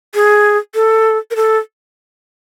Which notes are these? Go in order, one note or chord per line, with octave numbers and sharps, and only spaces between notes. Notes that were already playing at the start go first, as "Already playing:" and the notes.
G#4
A4
A#4
A4